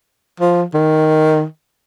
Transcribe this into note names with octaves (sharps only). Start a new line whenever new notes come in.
F3
D#3